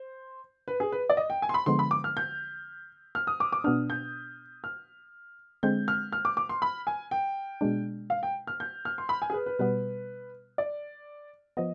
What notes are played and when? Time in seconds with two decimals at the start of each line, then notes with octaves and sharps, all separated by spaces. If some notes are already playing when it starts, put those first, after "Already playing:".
Already playing: C5
0.68 B4
0.80 G#4
0.92 B4
1.10 D5
1.17 D#5
1.30 G5
1.42 G#5
1.49 C6
1.54 B5
1.66 D3 F3 G#3 B3 C6
1.79 B5
1.91 D6
2.04 F6
2.17 G6
3.15 F6
3.27 D#6
3.40 D6
3.52 D6
3.64 B2 B3 D4 F6
3.90 G6
4.64 F6
5.63 D3 G#3 C4 G6
5.88 F6
6.12 F6
6.25 D6
6.37 D6
6.49 C6
6.62 B5
6.87 G#5
7.11 G5
7.61 B2 G#3 D4
8.10 F5
8.23 G5
8.47 F6
8.60 G6
8.85 F6
8.98 C6
9.09 B5
9.22 G#5
9.30 G#4
9.34 B4
9.46 B4
9.59 B2 G3 B3 B4
10.58 D5
11.57 F3 B3 D#5